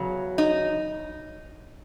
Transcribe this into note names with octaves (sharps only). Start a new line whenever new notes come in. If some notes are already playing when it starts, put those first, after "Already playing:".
Already playing: E2 C#3 F#3
D#4